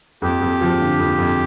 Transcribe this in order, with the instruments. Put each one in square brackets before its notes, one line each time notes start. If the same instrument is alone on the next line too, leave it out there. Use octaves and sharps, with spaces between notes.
[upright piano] F2 [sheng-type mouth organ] G4
[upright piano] F2
F3
D3
F2
F2